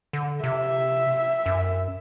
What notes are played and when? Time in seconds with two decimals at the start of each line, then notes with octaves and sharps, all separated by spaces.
0.13 D3
0.44 C3 E5
1.46 F#2